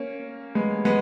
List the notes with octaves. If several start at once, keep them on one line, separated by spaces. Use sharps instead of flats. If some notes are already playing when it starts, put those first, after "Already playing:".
Already playing: A#3 C#4
G#3 B3
G#3 B3